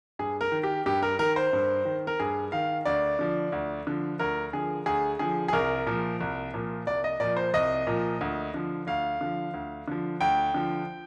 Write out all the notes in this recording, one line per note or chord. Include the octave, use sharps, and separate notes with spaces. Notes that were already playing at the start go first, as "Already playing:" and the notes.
G2 G#4
A#4
D#3
G4
G2 G4
A#4
D#3 A#4
C5
G2
D#3
A#4
G2 G#4
D#3 F5
D2 D5
D3 F3
D2
D3 F3
D2 A#4
D3 F3 G#4
D2 G#4
D3 F3 G#4
G#4
C2 A#4
A#2 F3
C2
A#2 F3
C2 D5
D#5
A#2 F3 D5
C5
C2 D#5
A#2 F3
D2
D3 F3
D2 F5
D3 F3
D2
D3 F3
D2 G5
D3 F3